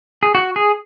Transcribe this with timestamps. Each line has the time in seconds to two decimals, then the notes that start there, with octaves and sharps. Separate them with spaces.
0.23 G#4
0.35 F#4
0.56 G#4